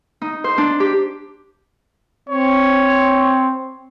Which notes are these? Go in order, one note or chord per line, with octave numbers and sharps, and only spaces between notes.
D#4
C5
D4
G4
C4 C#5